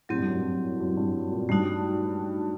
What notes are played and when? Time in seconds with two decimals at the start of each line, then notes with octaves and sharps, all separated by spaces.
0.09 A2 F#3 C4 G4
0.19 G2
0.27 F#2
0.34 G2
0.80 F#2
0.97 G2
1.32 A#2
1.49 G2 A3 D#4 F#4